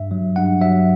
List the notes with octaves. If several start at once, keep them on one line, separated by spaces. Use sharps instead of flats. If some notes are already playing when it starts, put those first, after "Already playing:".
Already playing: G2 E5
F#3
G2 F#5
F#3 E5